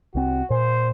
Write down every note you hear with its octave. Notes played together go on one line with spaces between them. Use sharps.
C2 C4 F#4
A#2 C5